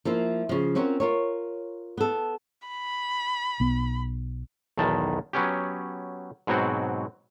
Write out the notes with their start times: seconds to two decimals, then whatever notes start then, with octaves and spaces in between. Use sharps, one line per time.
0.05 F3 A#3 E4 F4
0.49 C#3 F3
0.75 C4 C#4 F4 F#4 A#4
1.00 F4 A#4 C#5
1.97 B3 A4
2.68 B5
3.60 B1 B3
4.77 B1 E2 D#3 A5
5.33 F#3 B3 C#4 G4
6.47 G#2 B2 F#3 C4 F#4